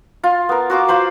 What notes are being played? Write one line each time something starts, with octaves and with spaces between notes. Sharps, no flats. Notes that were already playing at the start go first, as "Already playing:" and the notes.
F4
B3 A#4
F#4 C6 D6
F4 C5 B5 C6